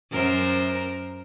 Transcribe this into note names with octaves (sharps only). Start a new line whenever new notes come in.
F#2 A#4 C5